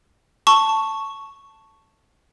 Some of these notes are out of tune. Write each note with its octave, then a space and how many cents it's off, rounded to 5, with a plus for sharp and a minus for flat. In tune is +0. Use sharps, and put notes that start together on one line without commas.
A5 +5 C#6 +0